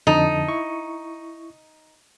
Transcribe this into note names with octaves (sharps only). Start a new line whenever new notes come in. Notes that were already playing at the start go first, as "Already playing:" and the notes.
F2 D3 D#4 A5
E4 C#6